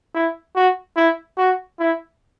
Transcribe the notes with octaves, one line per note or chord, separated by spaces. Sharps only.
E4
F#4
E4
F#4
E4